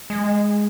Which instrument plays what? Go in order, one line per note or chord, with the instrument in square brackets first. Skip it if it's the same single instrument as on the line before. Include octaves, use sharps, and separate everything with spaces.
[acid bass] G#3